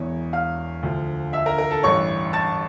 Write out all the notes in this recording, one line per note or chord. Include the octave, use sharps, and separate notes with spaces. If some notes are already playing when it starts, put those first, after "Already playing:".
Already playing: E1 E2 E3 C#5
F5 F6
D2 D3 F3
E5 E6
A#4 A#5
A#4 A#5
A4 A5
A1 G2 E3 C#5 C#6
A5 A6